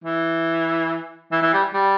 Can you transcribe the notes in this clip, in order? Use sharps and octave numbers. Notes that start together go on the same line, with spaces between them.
E3
E3
E3
G3
G3